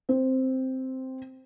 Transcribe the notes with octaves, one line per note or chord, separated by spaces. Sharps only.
C4